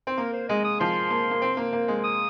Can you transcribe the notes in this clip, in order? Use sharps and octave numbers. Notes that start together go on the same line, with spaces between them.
C4
A#3 A#4
C5
G#3 D#5
D#6
F3 C6
A#3
A#3
C4
A#3
A#3
G#3
D#6